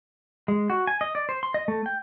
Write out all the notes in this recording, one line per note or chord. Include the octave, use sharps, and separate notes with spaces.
G#3
F#4
G#5
D#5
D5
C5
C6
D#5
A3
G5